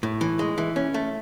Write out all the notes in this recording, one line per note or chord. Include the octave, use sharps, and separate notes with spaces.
A2
E3
G#3
E3
C#4
A3